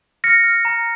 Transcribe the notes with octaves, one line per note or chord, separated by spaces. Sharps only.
F6 A#6 C#7
F6
A#5